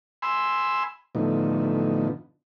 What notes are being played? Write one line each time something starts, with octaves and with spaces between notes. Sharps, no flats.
G#5 B5 C6 E6
A2 D3 F3 B3 D#4